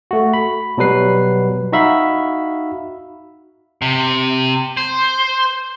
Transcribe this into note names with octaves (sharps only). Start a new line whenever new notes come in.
A3 F#4
B5
B2 F#3 G3 B4 C7
D#4 F#4 E5 F5 B5
C3
C5